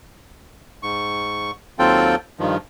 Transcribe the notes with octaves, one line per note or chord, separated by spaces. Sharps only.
G#2 C#6
D#2 F#3 C4 F4 A4 G5
G2 D#3 F3